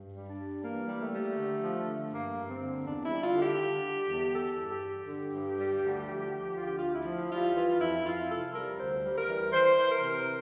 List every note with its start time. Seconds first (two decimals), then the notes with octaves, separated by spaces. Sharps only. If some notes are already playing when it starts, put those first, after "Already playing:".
Already playing: G2
0.13 G3
0.26 D4
0.38 G3
0.62 E3 A#3
0.88 G3
1.00 A3
1.12 G3
1.37 D3
1.61 F3
1.86 D3
2.11 G2 A#3
2.36 G2
2.49 C4
2.61 D3
2.85 E2 D4
3.04 E4
3.10 G3
3.22 F4
3.34 D3
3.40 G4
3.60 D3
3.84 G3
4.09 E2
4.33 G3 A4
4.59 G2
4.71 G4
4.83 G3
5.07 D3
5.33 G2
5.57 G3
5.82 D2
6.07 F3
6.31 F3
6.56 D3 F4
6.66 G4
6.76 D2 F4
6.93 E4
7.05 F3
7.30 G3 F4
7.55 E3 F4
7.80 F2 E4
8.05 F2 F4
8.29 C3 A4
8.54 G3 A#4
8.78 D2 C5
9.04 G3
9.16 A#4
9.28 E3
9.53 E3 C5
9.77 E3
9.90 A#4
10.02 C3